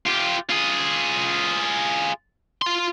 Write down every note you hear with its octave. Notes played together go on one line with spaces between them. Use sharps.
F4 G4
F4 G#4
F4 C6